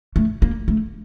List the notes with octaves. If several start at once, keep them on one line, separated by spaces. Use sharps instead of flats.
A3
A#3
A3